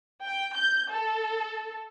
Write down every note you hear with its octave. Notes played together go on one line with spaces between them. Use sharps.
G5
G6
A4